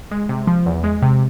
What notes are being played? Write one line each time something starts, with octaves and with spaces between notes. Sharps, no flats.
G#3
C3
F3
E2
G#3
C3